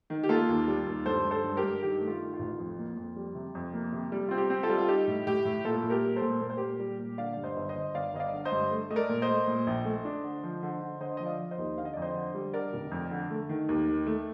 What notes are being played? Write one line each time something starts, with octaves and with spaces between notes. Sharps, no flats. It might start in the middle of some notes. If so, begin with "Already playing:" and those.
D#3
G4
A#3 F4 A4
D#2
G3
D#2
G2 A4 C5
G2
A4 C5
G2
G4 A#4
G2
D#3 G4
A3
F4
D#3
F4
A1
F2
A#3
F2
G3
C3
F2
A#3
C3
G3
C4 F4
G4
C4
F4 A4
G3
F4
D#4 G4
A2
A2 G4
A2
A#2 F4 A4
A#2
G4 A#4
G3
A4 C5
A#2
A#2 A#4
C5
A#2 G4 A#4
G3
A#2
D3 D5 F5
G2 D5
C5 D#5
G1
C5 D#5
G1
G1 D5 F5
G1 D#5
D5 F5
D3
C5 D#5
G2
A3
A3 D#5
A#4 D5
A#2
C5 D#5
A3
A#2
A#1
A3
D4
D3
F3
D3
D3
D3 C5 D#5
F3 D#5
D5 F5
F3
C5 D#5
D#2
D3 F5
D#5
F2 D5
C5 D#5
D3
G3
D3 A#4 D5
F1
F2
D3
A3
D#3
D#2
D#3
A3